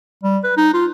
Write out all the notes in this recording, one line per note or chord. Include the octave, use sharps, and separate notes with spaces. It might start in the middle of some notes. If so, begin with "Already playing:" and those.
G3
B4
D#4
F4